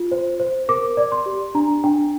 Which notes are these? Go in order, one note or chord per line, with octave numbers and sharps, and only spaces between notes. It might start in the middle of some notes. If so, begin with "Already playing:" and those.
Already playing: F4
C5
C5
A#4 D6
D5
C6
G4
D4 A#5
D4 G5